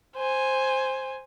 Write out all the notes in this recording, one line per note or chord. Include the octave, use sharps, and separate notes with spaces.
C5 G#5